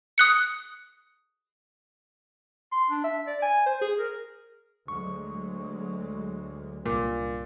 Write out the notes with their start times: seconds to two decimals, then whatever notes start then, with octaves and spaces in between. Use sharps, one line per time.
0.18 D#6 F#6 C#7
2.72 C6
2.90 D4
3.04 E5
3.27 D5
3.42 G#5
3.66 C5
3.81 G#4
3.99 A#4
4.88 D2 F#3 G#3 C#6
6.86 C2 G2 A#2 A#4 D6